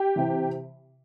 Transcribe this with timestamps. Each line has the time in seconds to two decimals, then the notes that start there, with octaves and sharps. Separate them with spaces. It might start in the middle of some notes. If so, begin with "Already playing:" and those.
Already playing: G4
0.16 C3 E3